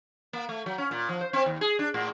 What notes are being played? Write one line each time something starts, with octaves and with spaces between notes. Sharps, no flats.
A#3
A3
F#3
C#4
A#2
F3
C5
C4
D#2
G#4
D4
A2